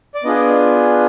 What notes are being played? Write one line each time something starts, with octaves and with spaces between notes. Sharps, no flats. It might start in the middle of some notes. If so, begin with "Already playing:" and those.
D5
B3 D4 F4 G#4 D#5